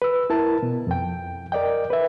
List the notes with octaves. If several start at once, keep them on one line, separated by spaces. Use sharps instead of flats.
B4 E6
E4 A#4 A5
B2
F2 G5
A#4 D5 D#5 G5
B4 E5